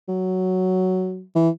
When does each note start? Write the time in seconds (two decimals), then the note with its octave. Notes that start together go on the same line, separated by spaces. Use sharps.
0.08 F#3
1.35 E3